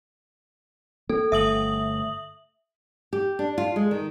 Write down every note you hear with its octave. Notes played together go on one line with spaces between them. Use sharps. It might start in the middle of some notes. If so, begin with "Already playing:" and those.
A#3 A4
G1 A3 E5 D#6 F#7
G4
D4
F4
G#3
D#3